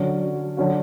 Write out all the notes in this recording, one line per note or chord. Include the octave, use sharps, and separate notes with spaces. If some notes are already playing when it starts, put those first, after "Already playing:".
Already playing: D3 F#3 C#4
D3 F#3 C#4 F#4